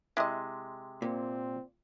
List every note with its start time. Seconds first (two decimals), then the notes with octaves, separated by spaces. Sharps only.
0.17 C3 G#3 E4 D#5
1.02 A#2 C4